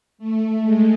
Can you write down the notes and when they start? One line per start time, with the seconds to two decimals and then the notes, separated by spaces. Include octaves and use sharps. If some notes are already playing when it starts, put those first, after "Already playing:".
0.18 A3
0.63 G#3